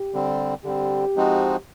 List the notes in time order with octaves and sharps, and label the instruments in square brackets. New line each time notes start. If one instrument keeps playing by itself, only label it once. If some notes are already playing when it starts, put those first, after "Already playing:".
Already playing: [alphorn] G4
[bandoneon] D3 G3 C4
[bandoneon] D3 G3 C4 [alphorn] G4
[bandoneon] F3 G#3 C4 D#4 F#4